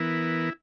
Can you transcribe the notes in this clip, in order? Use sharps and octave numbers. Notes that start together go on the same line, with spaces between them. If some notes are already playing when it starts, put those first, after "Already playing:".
Already playing: E3 B3 E4 A#4